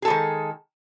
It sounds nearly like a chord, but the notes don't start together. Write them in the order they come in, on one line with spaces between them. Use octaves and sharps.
G#4 A4 G#3 D#3